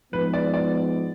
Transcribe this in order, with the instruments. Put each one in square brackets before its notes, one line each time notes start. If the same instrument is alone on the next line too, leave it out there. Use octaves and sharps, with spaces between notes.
[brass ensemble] G#2 F3 G#3 B3 [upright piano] B4
[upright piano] D5
D5